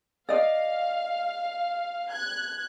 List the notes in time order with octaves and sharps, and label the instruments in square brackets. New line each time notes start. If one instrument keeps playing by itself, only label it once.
[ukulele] D5 D#5 [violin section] F5
[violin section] F#6 G#6